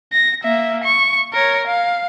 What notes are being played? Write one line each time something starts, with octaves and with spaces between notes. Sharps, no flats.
A#6
A#3 E5
C#6
A#4 C#5
F5